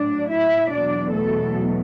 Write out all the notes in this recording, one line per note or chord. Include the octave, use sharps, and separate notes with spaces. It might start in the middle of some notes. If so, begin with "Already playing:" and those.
Already playing: A2 F#3 D4 D5
E4 E5
E2 B2 F#3 D4 D5
A3 A4